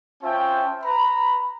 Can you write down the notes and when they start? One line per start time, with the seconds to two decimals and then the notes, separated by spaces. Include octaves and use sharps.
0.23 C#4 F4 C5 E5 G5 A5
0.84 B4 A#5 B5